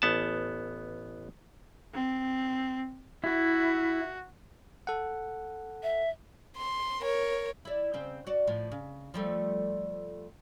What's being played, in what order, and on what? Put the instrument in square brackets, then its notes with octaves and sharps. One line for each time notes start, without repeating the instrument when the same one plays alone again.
[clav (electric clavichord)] A1 B3 A5
[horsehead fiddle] C4
[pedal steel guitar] E4 [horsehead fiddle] F#4
[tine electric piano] A4 F#5
[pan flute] E5
[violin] C6
A#4 C#5
[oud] E4 D5
C#3 C4
F#4 D5
A2 F3
C#3
F3 G3 A3